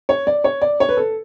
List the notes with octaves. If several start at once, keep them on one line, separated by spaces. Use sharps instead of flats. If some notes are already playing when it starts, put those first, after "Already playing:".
C#5
D5
C#5
D5
C#5
B4
A4